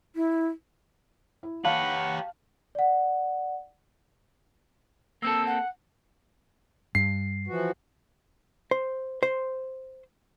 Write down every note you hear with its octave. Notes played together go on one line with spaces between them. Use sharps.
E4
E4
G4 B4 C#5 F5 F#5 A5
D5 F#5
A#3 C4 A4 E6
F#5
G2 C7
E3 F3 F#4
C5
C5 C6